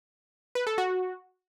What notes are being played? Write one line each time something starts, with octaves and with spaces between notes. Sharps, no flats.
B4
A4
F#4